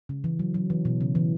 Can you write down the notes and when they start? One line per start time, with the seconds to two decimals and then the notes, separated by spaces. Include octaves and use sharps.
0.09 C#3
0.24 E3
0.39 F#3
0.54 F#3
0.70 E3
0.85 B2
1.01 C#3
1.15 E3